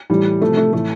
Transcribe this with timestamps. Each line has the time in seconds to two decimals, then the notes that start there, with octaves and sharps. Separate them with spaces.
0.10 A2 E3 G3
0.42 C3 F3 A3
0.57 A3
0.73 A2 E3 A3